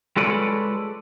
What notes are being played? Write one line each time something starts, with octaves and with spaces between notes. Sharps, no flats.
G#3 F4 A4 B4 C#5 D5